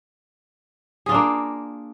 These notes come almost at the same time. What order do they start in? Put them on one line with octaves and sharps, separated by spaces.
G#4 F4 D4 A#3